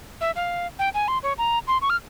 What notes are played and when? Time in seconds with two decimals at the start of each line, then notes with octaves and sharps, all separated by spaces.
0.21 E5
0.36 F5
0.79 G5
0.94 G#5
1.08 C6
1.23 C#5
1.38 A#5
1.67 C6
1.82 C#6
1.90 F6